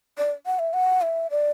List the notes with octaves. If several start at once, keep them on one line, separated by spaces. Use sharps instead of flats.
D5
F#5
E5
F#5
E5
D5